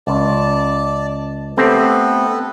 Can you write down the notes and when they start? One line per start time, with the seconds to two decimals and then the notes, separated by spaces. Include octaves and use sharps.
0.07 C#2 D5 A5
1.57 A3 B3 C4 G4 A4 B4